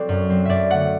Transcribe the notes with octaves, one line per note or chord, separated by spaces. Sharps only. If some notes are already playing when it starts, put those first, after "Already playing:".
Already playing: F#3 C4 A4 D5
F#2
F#3 C4
F#2 D5 E5
D3 A3 F#5